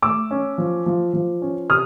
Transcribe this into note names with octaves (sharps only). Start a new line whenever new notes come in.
A3 D6 E6
C#4
F3
F3
F3
C#4
C3 D#6 F6